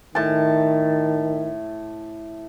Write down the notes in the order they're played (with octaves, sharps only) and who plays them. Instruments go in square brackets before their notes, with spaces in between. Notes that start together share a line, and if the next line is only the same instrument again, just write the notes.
[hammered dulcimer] A2 A5 [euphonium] D#3